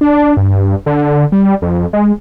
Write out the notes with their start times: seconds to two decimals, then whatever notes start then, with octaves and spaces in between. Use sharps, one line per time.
0.01 D4
0.37 G2
0.86 D3
1.32 G3
1.62 F2
1.93 G#3